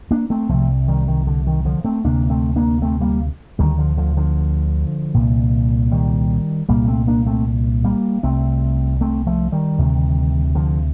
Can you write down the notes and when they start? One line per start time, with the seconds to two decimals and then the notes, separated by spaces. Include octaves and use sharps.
0.11 A#3 D4
0.30 A3 C4
0.49 C2 C3 F3 A3
0.88 D#3 G3
1.08 D#3
1.27 D3
1.47 D#3
1.65 D3 F3
1.85 A3 C4
2.04 D2 C3 A#3 D4
2.30 A3 C4
2.56 A#3 D4
2.82 A3 C4
3.01 G3 A#3
3.59 D2 D3 D#3 G3
3.78 D3 F3
3.97 D3 F3
4.17 D3 F3
5.14 C2 A#2
5.91 D#3 G3
6.69 C2 A#2 G3 A#3
6.88 A3 C4
7.08 A#3 D4
7.26 A3 C4
7.84 G3 A#3
8.23 C2 C3 A3 C4
9.01 A3 C4
9.27 F3 A3
9.52 D#3 G3
9.78 D2 C3
10.55 D3 F3